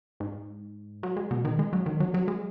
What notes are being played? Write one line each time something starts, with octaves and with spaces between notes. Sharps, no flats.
G#2
F#3
G#3
B2
D#3
G#3
F#3
D#3
F#3
F#3
G#3